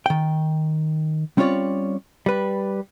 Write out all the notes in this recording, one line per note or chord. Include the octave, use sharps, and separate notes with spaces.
D#3 G5
G3 C4 C#4 F4 C#5 D5
G3 B4